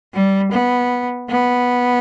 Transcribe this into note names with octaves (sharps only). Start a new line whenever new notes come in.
G3
B3
B3